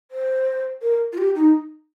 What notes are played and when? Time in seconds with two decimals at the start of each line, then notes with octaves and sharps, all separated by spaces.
0.11 C5
0.82 A#4
1.13 F4
1.18 G4
1.35 D#4